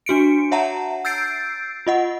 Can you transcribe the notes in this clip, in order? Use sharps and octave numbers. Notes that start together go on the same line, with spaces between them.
D4 F#4 C#7 D7
C#5 E5 F#5 A5 A#5
E6 G6 A6 C7 D7
F4 D#5 F#5